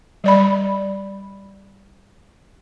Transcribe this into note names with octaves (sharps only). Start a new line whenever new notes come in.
G3 D5 B5